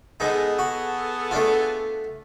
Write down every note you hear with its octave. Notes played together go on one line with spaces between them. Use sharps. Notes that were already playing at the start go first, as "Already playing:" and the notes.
G#3 B3 D#4 G#4 A4
F#4
A3 D4 F4